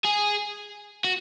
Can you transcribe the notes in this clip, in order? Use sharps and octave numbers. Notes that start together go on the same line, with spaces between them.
G#4
F#4